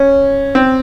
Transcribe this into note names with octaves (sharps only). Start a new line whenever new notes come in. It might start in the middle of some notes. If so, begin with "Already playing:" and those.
Already playing: C#4
C4